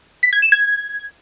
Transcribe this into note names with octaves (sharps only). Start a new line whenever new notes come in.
B6
G#6
E7
G#6